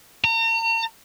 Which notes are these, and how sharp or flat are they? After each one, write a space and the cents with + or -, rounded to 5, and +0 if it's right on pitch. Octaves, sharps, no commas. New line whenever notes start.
A#5 -40